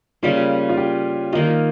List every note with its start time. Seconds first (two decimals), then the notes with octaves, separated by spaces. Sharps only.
0.23 C#3 G3 A#3 F4
0.69 F4
0.77 G4
1.33 D#3 A#3 D#4 F4